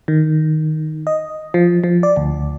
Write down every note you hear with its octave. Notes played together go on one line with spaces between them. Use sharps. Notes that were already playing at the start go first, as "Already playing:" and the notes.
D#3
D#5
F3
F3
D5
D2